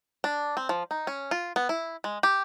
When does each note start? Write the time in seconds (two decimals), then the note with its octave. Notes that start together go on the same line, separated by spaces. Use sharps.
0.24 D4
0.57 C4
0.69 F3
0.91 D#4
1.07 C#4
1.31 F4
1.56 B3
1.69 E4
2.04 G#3
2.23 G4